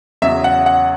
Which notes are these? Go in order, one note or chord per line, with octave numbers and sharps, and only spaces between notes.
E2 C#3 F#3 E5
F#5
F#5